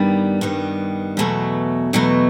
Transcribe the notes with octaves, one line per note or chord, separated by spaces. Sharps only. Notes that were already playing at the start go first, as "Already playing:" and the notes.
Already playing: G2 D#3 G3 B3
G2 D#3 G3 B3
E2 B2 F#3 A3
E2 B2 F#3 A3